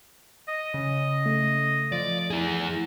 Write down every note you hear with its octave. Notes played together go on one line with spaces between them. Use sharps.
D#5
C#3
A3
F3 D5
E4 G#4